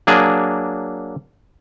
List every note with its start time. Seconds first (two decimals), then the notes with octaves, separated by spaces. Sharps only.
0.07 F#3 A#3 D4 G#4